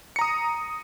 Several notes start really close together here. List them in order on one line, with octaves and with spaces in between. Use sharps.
C#7 A#5 D#6